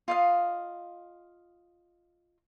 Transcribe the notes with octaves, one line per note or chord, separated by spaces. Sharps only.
F4 D#5 F5